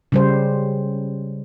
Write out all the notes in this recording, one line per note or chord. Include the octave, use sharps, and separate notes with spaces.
C#3 G3 C5